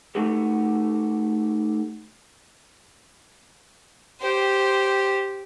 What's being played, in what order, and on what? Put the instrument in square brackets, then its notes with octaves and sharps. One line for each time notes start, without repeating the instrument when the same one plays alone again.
[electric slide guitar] A3 D#4 F#4 G4 A4
[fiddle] G4 C5